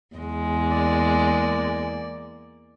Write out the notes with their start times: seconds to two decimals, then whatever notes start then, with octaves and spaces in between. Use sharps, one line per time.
0.16 E2 G#3
0.68 A#3 D5